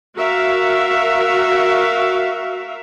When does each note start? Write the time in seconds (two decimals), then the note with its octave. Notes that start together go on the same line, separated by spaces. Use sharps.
0.17 F#4 A#4 E5 F5